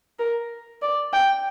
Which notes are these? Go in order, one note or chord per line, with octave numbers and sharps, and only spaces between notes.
A#4
D5
G5